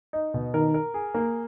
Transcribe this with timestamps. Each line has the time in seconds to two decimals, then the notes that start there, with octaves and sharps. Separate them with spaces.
0.13 D#4
0.34 B2
0.54 D#3 A#4
0.74 A#4
0.94 G#4
1.15 A#3